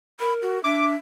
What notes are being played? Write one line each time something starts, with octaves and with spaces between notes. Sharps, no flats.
A#4 B5
F#4
D4 E5 D6